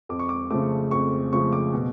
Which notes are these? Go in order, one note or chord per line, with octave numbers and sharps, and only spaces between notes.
F2 D6
C#6
D6
C#3 F3 A3 D6
F2 C#6
C#3 F3 A3 C#6
D6
B2